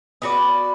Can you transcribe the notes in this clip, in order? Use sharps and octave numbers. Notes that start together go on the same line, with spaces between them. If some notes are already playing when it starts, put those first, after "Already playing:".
B3 F#4 B4 D5